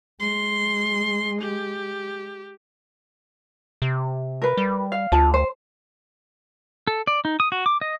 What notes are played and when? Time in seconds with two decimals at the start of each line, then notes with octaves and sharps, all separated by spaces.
0.20 G#3 C6
1.41 G4
3.82 C3
4.42 A#4 B4
4.57 G3
4.92 F5
5.12 D2 F4 G#4 A5
5.34 C5
6.87 A4
7.07 D5
7.25 D#4
7.40 D#6
7.52 F#4
7.66 D6
7.81 D#5